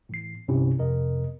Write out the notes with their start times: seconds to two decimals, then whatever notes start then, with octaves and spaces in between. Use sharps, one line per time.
0.09 A2 E3 C7
0.48 C2 G2 C3 C#4 E4
0.78 F2 C3 A#4 D#5